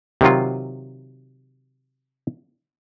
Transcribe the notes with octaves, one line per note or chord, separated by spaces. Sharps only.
C3 D#3 F#3 F4